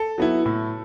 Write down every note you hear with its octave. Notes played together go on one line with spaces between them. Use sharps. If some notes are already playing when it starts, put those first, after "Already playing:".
Already playing: A4
F#3 B3 E4
A2